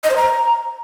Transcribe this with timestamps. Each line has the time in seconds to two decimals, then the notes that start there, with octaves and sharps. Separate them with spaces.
0.04 D#5
0.10 C5
0.16 A#5